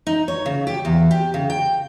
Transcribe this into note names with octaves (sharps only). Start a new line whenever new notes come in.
D#4
C#5
C#3
G4
E2
G4
C#3
G5